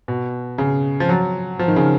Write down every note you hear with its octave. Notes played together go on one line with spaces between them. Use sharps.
B2
C#3
F3
F#3
F3
D#3
C#3